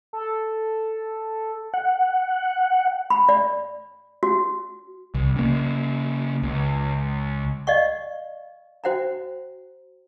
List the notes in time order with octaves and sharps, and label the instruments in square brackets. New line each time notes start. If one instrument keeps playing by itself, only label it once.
[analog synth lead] A4
[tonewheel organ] F#5
[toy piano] B5
D5
F#4
[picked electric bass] C2
C#3 A#3
C#2
[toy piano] D5 D#5 F5 F#5 C#6
F#4 C5 F#5 G5 A#5